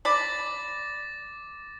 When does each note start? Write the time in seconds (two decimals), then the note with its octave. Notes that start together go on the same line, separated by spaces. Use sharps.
0.05 D5 B5 D6 A6 A#6